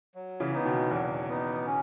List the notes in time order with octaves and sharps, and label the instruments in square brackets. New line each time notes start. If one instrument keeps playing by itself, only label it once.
[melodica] F#3
[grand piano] C#3 E3
[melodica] B3 D#4
[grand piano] B2 D#3
[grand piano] E2 [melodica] F#3
[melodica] B3 D#4
C#4